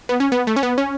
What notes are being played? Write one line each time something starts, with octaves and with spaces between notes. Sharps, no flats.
B3
C#4
B3
A3
C#4
B3
C#4